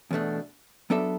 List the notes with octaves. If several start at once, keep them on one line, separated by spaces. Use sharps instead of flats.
E2 B2 A3 D4
F#3 B3 D4 A4 E5